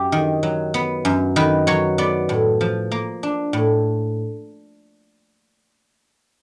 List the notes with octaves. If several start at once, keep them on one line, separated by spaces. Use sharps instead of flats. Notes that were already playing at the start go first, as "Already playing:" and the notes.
Already playing: F#2 G4
D#3
F#3
B3
F#2
D#3 B4
F#3 C#5
B3 D5
A2
F3
A#3
D4
A2